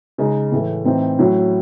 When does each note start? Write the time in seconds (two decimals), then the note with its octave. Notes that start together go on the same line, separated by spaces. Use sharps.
0.18 C#3 G#3 D#4
0.52 A2 E3 A3
0.85 A2 E3 C4 D#4
1.19 A2 F#3 C#4 E4